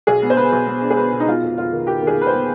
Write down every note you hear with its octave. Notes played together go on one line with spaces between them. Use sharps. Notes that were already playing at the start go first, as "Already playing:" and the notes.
B1 G#4
B3
C5
B3 B4
B1
B3
D4
G#4
B3 B4
B2
D#4
B3 F4
F1
F1 F4
D#3
D#3 G4
D#2
G#4
D#2 B4
C5
B3